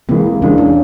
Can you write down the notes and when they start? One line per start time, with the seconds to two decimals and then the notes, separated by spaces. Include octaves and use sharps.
0.09 C3 E3 G#3 A#3
0.42 E2 C#3 E3 G#3 D4
0.58 C#4